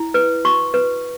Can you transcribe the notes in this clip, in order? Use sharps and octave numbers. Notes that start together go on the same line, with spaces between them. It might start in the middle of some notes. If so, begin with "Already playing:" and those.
Already playing: E4
B4
F#4 C#6
B4